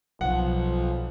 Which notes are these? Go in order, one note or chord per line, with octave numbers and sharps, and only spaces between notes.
B1 F3 F#5